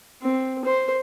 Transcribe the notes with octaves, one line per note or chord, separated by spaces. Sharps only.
C4
C5